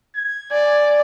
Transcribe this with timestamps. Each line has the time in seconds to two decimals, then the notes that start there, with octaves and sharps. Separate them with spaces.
0.15 G#6
0.52 D5 G#5